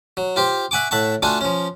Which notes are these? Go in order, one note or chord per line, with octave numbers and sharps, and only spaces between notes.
F#3
F4 G4 C5
E5 F#5 G#5 C#6 D6
A2 E5 F#5 A5 C#6
A3 D4 F4 F#4 A4 G#5
F3 C#4